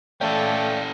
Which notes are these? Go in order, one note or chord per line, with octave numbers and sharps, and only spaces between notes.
A3 C#4 A4 D5 F5 G5